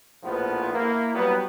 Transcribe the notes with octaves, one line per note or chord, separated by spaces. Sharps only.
A#1 A2 F3 B3
A#3 E4
F#3 G3 B3